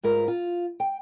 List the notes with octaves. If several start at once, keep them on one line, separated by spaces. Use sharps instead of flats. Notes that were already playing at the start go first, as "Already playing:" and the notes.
G#2 F4 A#4 B4
F4
G5